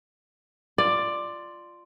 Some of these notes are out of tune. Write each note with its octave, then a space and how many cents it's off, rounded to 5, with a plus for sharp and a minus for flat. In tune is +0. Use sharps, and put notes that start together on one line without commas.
F4 -5 D5 +10